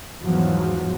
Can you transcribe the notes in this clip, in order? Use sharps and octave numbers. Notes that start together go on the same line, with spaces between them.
E2 G#2 F3 F#3